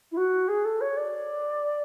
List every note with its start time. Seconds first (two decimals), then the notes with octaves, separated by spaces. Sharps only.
0.11 E4
0.17 F#4
0.48 G#4
0.64 A4
0.81 C#5
0.96 D5